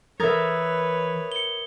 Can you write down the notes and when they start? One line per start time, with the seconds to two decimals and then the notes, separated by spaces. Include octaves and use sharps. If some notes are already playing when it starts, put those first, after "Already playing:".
0.20 E3 A#4 B4 C#5 E5 D#6 G#6 A6
1.32 C#7 G7